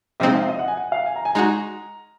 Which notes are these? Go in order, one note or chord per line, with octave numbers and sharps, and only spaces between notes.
C3 F3 G#3 C4 D#4 D#5
F5
D#5
F#5
G#5
F#5
F5
G#5
A#5
G#5
G#3 D#4 F#4 A#5